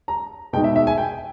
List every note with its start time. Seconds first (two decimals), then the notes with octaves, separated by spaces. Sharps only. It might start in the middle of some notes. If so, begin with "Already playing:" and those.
0.08 A#5
0.53 B2 G#3 D#4 G5
0.64 E5
0.76 E5
0.87 G#5
0.98 G5